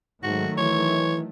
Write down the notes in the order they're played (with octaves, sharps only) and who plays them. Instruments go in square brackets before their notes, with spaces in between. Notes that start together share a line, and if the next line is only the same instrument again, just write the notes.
[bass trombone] G#2 [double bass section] D#3 F#3 A3 [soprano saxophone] F#4
[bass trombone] E3 [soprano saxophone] C#5